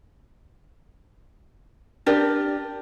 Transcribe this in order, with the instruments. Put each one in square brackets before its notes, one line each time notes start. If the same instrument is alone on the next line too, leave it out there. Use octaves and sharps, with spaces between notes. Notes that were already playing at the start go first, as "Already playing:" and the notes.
[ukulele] D4 G4 A#4 D5